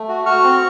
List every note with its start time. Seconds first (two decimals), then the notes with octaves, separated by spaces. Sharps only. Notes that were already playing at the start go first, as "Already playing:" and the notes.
Already playing: A3
0.09 F#4
0.26 F#4 C#6 F6
0.44 C4